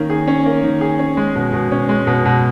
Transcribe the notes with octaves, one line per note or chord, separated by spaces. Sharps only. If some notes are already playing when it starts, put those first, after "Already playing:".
Already playing: D#3 A#3 C#4
G#4
C#4
A#3
D#3
G#4
C#4
G#3
B2
B2
C#4
G#3
B2
B2